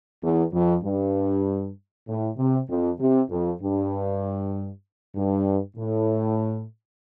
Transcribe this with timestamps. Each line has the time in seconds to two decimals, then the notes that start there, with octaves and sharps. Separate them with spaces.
0.21 E2
0.53 F2
0.83 G2
2.07 A2
2.37 C3
2.68 F2
2.99 C3
3.30 F2
3.61 G2
5.15 G2
5.77 A2